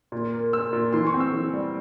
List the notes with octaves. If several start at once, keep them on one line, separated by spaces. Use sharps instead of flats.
A#2
A#3
A#3 E6
A#2
E3 C6
C#6
C4
E6
E3
G3